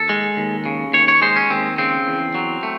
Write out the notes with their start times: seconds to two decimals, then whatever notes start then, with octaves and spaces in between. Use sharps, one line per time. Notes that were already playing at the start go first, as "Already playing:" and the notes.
Already playing: D#2 A4
0.09 G#3
0.37 D#2
0.66 C#3
0.93 D#2 C#5
1.08 C#5
1.22 G#3 C5
1.36 C#4
1.50 D#2 C4
1.78 C#3 C4
2.07 E2
2.35 F#3
2.63 A3